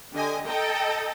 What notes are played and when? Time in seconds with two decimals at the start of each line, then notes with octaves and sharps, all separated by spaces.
0.13 D3 G4 D#5 G#5
0.47 A4 D#5 G5 A#5